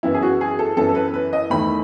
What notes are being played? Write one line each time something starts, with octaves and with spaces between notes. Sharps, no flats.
F#2 E3 B3 E4
G#4
F#4
G#4
A4
F#2 E3 B3 A4
A4
B4
B4
D#5
E2 D#3 A3 B5